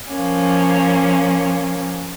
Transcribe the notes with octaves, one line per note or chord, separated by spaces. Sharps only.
F3 A#3 C#4